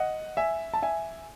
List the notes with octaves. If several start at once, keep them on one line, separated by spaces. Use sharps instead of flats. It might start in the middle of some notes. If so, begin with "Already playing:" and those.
Already playing: D#5 F#5
E5 G#5
A5
E5 G#5